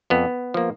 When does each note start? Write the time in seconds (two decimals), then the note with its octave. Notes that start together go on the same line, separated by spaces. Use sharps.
0.10 F2 B3
0.54 F3 A#3